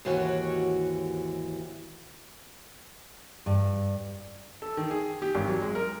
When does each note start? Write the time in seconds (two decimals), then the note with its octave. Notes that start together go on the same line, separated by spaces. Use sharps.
0.05 D#2 G#2 E3 F#4 G4 C#5
3.46 G2
4.62 A4
4.77 D#3
4.91 G#4
5.22 G4
5.35 G#1
5.48 F#3
5.62 G#3
5.75 A#4